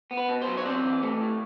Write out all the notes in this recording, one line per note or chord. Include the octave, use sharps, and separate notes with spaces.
B3
B4
B2
C5
F#3
C#5
C4 D5
E3
A3
A2